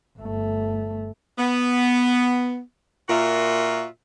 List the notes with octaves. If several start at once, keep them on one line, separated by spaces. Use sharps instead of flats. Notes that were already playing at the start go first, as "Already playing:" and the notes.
G1 A3
B3
A#2 F4 F#4 A#4 E5